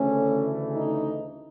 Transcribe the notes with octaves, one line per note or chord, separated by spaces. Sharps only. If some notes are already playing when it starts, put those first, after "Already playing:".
Already playing: D2 C#3 E3 A3 C#4
D#4